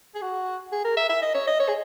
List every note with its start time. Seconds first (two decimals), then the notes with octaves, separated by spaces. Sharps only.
0.15 G#4
0.22 F#4
0.72 G#4
0.85 A#4
0.97 E5
1.10 E5
1.22 D#5
1.35 C#5
1.47 D#5
1.60 C#5
1.68 G#4